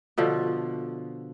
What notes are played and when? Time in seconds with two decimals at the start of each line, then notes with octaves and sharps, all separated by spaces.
0.18 B2 D3 F3